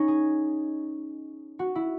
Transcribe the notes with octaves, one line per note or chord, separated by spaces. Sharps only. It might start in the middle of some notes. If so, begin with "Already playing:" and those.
Already playing: C#4 D#4
G#4
F#4
E4